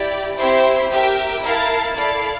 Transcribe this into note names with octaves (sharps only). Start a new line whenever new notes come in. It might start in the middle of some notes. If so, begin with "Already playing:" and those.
Already playing: E4 G4 D5 G5
C4 E4 G4 C5 E5
G4 A#4 E5 G5
E4 A#4 F5 A5
E4 A4 D5 F5